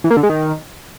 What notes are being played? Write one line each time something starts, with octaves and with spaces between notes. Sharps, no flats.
E3
A#3
D3
G#3
D#3